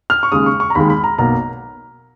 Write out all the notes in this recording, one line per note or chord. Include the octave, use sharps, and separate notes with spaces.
F6
C#6
D#2 C#3 G#3 D#6
C#6
C#6
A#5
D#2 D#3 G#3 B5
B5
A#5
B1 B2 A#3 A#5